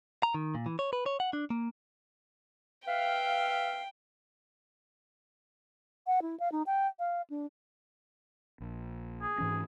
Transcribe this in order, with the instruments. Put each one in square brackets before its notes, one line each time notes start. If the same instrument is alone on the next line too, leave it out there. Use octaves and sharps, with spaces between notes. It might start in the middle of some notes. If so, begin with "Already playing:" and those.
[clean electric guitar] A#5
D#3
A#2
E3
C#5
B4
C#5
F#5
D4
A#3
[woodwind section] B4 E5 F5 [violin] G5
[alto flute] F#5
E4
F5
D#4
G5
F5
D4
[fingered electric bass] A#1
[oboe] G#4
[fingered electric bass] G#2 E3 C#4